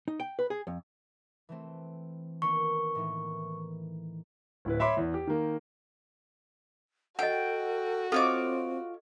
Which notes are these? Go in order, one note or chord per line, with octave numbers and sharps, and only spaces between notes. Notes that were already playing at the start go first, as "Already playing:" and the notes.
D#4
G5
B4
G#4
F2
E3 A3 C4
D#3 A#3 B3 C#6
A2 D#3 E3
D1 E4 B4
C#5 E5 B5 C6 D6
E2
G4
D#3 A#3
F#4 A4 D#5 F#5 G5
C4 F4 A4 C#5 D#5 D6